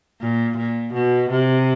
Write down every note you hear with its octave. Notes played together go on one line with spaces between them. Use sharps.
A#2
A#2
B2
C3